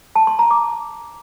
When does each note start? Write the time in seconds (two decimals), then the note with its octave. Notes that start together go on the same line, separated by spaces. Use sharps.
0.15 A5
0.27 C6
0.39 A#5
0.51 D6